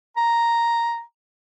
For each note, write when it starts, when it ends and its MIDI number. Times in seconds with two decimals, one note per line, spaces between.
0.17 1.01 82